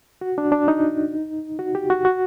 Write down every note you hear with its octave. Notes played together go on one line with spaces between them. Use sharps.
F#4
D4
D4
D#4
F#4
G4
F#4
F#4